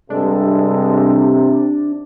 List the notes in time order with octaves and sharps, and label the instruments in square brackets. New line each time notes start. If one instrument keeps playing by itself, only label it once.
[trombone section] G2 G#3 A4 [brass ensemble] C3 [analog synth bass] D4